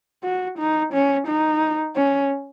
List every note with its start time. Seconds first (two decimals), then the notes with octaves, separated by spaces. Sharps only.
0.23 F#4
0.58 D#4
0.93 C#4
1.27 D#4
1.96 C#4